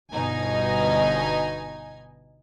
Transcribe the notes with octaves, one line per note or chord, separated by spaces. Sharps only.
G1 B2 D#4 G#5